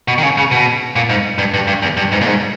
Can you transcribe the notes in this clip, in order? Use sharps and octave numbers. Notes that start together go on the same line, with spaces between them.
B2
D#3
C#3
C#3
B2
A#2
G#2
G2
G2
G2
E2
G2
G#2
A#2
G#2